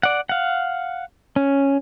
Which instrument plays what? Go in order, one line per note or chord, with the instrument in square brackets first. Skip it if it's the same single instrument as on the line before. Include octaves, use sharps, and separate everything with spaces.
[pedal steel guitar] D5 F#5
F5 F#5
C#4